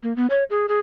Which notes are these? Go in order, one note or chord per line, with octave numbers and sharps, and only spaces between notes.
A#3
B3
C#5
G#4
G#4